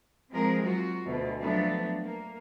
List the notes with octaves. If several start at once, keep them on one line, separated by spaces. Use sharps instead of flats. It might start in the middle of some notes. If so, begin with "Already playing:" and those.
F3 G#3 C4 G#4 A#4
F#3 F4 F#4
D2 B2
F3 F#3 A3 B3 D4
A#3